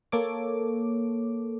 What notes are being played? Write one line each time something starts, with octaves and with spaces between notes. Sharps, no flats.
A#3 A4 C#5 D6